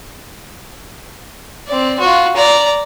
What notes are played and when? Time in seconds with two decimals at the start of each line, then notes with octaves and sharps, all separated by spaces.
1.67 C4 D5
2.00 F4 F#4
2.36 D5 A#5